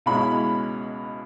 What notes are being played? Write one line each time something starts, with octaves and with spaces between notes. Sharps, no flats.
C#2 B2 G#3 C#4 E4 B5